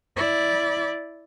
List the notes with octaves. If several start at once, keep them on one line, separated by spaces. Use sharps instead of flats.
E4 D5